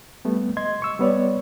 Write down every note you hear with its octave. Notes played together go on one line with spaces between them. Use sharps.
G3 A3 B3
D#5 C6 G#6
C#6 E6
G3 B3 C#5 D5